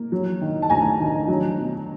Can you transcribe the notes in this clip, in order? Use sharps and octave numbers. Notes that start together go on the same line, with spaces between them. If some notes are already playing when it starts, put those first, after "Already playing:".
Already playing: A#3
F#3
D#3
A5
D2 G#5 A#5
D#3
F#3
B2